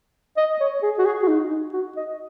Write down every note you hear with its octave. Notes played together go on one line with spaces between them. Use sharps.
D#5
C#5
G#4
F#4
G#4
F#4
D#4
D#4
F#4
D#5